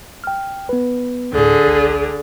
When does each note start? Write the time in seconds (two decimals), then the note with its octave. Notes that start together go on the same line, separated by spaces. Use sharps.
0.24 G5 F6
0.69 B3 B4
1.33 D2 A2 D3 G#4
1.66 G#1 C#2